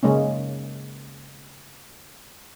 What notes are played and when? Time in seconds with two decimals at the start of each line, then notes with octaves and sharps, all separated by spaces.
0.03 C#3 G#3 A#3 C#4